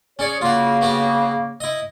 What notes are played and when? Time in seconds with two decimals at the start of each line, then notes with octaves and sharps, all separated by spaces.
0.19 C#4 G#4 C#5 D5
0.41 C#3 A#3 F4 F#4
0.81 B3 F#4 G4
1.60 E4 D#5